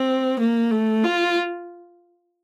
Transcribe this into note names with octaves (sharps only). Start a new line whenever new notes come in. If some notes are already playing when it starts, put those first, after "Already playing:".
Already playing: C4
A#3
A3
F4